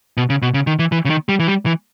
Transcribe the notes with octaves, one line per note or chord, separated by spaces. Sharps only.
B2
C#3
B2
C#3
D#3
E3
E3
C#3
D#3
G3
E3
G3
E3